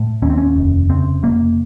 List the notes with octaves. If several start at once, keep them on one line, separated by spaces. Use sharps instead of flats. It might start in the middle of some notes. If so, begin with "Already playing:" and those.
Already playing: A2
D#2 C#4
C4
C#4
F1
C#3 C4
F1 A#3